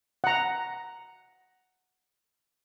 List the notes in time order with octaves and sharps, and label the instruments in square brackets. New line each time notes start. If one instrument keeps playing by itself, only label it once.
[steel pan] F#5 A#5